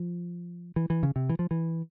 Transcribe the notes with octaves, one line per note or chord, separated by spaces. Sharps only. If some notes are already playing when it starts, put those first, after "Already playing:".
Already playing: F3
E3
E3
C#3
C3
E3
F3
E3